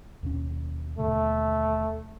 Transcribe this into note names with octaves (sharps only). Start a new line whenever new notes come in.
D#2 B2 C#4
D#2 B2 D3 A3